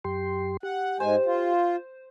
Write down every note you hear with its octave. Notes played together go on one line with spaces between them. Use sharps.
F#2 G4 C6
G4 F#5
G#2 G#3 C5 G#5
F4